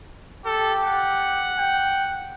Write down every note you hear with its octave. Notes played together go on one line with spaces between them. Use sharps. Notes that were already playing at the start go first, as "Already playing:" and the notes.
G4 A4
F#5
G5